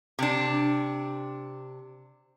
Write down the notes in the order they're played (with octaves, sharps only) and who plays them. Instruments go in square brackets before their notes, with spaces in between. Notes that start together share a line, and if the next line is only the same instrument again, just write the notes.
[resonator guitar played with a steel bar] C3 D4